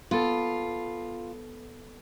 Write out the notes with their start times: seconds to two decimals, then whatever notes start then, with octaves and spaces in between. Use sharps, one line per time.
0.11 B3 F4 A4